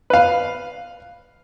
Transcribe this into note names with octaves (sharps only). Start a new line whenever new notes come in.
B4 F5